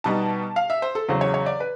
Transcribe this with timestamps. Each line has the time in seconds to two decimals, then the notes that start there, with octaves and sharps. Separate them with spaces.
0.04 B2 G3 B3 D#4 A5
0.56 F5
0.70 E5
0.82 C5
0.95 A4
1.09 E2 C#3 F#3 C5
1.21 C#5
1.34 C#5
1.46 D5
1.60 B4